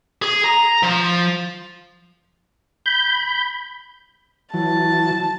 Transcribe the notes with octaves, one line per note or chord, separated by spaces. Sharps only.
G#4
A#5
F3
B5 G6
E3 F#3 A5